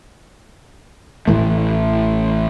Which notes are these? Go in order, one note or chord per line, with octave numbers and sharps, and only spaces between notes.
A1 A2 E3 A3